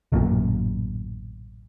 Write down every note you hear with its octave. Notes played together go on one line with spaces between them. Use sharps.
D1 A1 F#2 A#2